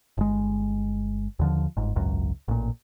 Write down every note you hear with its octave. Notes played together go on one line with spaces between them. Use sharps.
G1 G#3
D#2 D3 F3
G1 G#2
G#1 C#2 F#2
A1 A#2